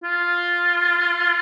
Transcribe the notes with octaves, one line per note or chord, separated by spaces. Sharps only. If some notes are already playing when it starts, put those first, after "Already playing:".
F4